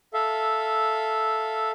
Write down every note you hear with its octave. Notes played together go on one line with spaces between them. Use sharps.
A4 E5 F5